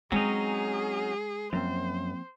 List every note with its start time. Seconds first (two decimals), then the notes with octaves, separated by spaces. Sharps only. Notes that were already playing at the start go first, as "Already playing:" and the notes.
0.12 F#3 G#3 C4 C#4 D#4 G#4
1.53 F#2 F3 A#3 C4 C5